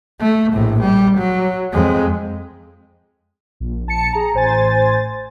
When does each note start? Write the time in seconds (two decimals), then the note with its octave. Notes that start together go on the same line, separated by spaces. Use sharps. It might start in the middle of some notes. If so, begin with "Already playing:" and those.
0.20 A3
0.52 A#1 A2
0.81 G3
1.18 F#3
1.72 F2 G#3
3.60 A#1
3.86 A#1 A5 C#7
4.13 G#4 A#5
4.34 A1 C5 G#5 A6